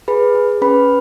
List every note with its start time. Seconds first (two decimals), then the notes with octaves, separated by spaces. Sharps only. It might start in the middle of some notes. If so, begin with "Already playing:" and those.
0.08 G#4 B4 B5
0.35 G#4
0.61 C#4 B4 B5